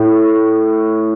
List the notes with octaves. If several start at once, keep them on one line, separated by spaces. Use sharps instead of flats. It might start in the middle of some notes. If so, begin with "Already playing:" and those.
Already playing: A2